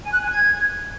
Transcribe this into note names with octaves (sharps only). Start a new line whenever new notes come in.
G#5
F#6
G#5
G#6